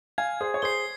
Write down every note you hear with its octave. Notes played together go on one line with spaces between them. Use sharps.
F5 G#5 G#6
G#4 C5
C#5
G#4 C5 C7 G7